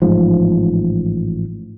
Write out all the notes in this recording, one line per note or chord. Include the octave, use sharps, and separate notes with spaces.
A1 G#2 F3